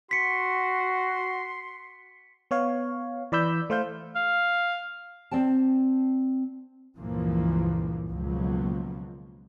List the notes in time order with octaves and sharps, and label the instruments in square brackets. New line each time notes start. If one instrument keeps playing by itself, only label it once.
[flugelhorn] F#4 [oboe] C6 [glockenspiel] B6 C#7
[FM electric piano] B3 C#5 F5
E3 D5 B5 E6 G6
A3 C5 F5 G6
[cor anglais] F5
[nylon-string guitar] C4 D5 G5 A5
[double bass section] C#2 G2 A#2 E3 F3 A#3
C#2 B2 F3 F#3 A#3